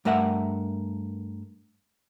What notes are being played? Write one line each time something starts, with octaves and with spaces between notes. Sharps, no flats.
G2 A3 A#4 E5 F#5